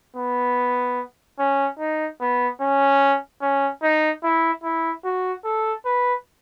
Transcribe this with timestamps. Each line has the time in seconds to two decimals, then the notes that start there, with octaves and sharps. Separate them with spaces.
0.16 B3
1.39 C#4
1.79 D#4
2.20 B3
2.61 C#4
3.41 C#4
3.82 D#4
4.23 E4
4.63 E4
5.05 F#4
5.44 A4
5.85 B4